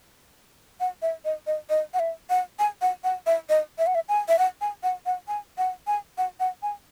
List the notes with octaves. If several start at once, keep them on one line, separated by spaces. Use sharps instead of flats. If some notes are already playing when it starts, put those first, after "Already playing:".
F#5
E5
D#5
D#5
D#5
F#5
E5
F#5
G#5
F#5
F#5
E5
D#5
E5
F#5
E5
G#5
E5
F#5
G#5
F#5
F#5
G#5
F#5
G#5
F#5
F#5
G#5